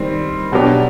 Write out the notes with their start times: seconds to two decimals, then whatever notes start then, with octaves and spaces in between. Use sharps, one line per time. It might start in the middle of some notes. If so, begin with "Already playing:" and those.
Already playing: D#3 G3 C4
0.52 B2 F#3 B3 D4 G4